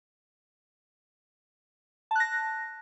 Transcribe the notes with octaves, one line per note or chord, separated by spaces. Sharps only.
A5 F#6 A#6